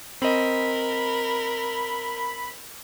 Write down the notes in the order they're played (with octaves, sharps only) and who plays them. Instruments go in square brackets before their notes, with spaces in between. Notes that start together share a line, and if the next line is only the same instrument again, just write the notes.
[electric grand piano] C4 D#5 [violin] A#4 [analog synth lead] B5